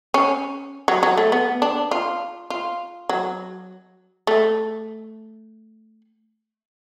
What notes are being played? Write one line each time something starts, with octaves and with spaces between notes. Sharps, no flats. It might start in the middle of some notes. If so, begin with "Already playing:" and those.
C#4
F#3
F#3
A3
B3
D4
F4
F4
F#3
A3